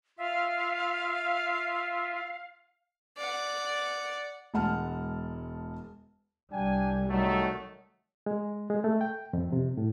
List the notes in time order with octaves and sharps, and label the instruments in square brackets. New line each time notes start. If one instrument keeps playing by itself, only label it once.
[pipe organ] F4 E5 [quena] F5
[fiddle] D5 F#5
[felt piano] E1 G#3 F#5 A5 F6
[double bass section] C2 G3 [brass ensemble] D4 G5 G#5
[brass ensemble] D#3 F#3 A3
[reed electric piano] G#3
G#3
A3
G5
F2
C3
A2